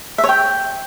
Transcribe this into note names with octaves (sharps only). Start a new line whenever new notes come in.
E5
C#5
G5